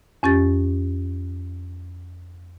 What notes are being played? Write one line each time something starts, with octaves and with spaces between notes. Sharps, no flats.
F2 C#4 G4 A6